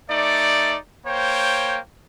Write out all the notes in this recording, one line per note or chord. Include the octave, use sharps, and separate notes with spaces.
A3 D#4 D5
A#3 C5 C#5 G5